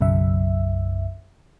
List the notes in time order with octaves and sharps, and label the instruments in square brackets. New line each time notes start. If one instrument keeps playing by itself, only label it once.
[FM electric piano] B1 F#2 C#3 E5